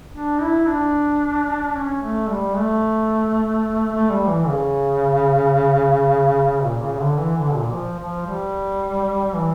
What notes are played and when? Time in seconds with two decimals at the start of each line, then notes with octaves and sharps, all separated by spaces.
0.13 D4
0.40 E4
0.67 D4
1.76 C#4
2.03 A3
2.29 G3
2.57 A3
3.92 A3
4.10 G3
4.28 E3
4.47 C#3
6.64 A#2
6.82 C#3
6.93 C#3
7.00 D3
7.18 E3
7.37 D3
7.55 A#2
7.72 F3
8.00 F3
8.27 G3
9.35 E3